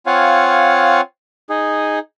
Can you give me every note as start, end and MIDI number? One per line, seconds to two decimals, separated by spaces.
0.06 1.01 60
0.06 1.01 65
0.06 1.01 73
0.06 1.01 77
0.06 1.01 78
0.06 1.01 80
1.50 1.99 63
1.50 1.99 68